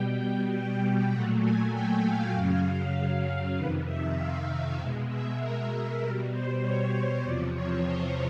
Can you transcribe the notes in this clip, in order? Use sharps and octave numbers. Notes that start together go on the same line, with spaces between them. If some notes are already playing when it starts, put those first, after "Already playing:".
Already playing: B2 G3 G5
A#2 F#3 A3 F#5
G#5
G5
F5
F#2 C#3 F#3
F2 C3 D#3 B4
E5
F5
B2 G#3
E5
A#4
A#4
B2 G3 A#4
C5
C#5
E2 C3 F3 D5
C#5
C5